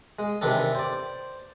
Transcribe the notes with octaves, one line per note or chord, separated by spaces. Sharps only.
G#3
C3 D#3 E3 D4 A4
C5 D5